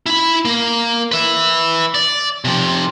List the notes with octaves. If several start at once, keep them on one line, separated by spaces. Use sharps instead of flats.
E4 B5
A#3
B4 E5
D5
C3 F3